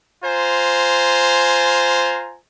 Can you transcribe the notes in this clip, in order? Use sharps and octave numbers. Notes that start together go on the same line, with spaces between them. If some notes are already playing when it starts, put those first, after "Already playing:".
F4 C5 G#5 A#5